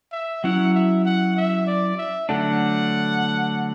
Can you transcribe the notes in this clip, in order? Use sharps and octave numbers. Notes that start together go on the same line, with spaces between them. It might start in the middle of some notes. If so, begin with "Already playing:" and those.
E5
F#3 C#4 E4 F#5
E5
F#5
E5
D5
E5
D3 F#3 A3 D4 F#5